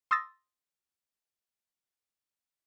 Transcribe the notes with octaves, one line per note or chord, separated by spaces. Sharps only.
C6 D#6 E6 A6 A#6